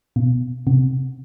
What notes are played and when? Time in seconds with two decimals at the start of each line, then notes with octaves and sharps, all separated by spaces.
0.16 B2
0.67 C3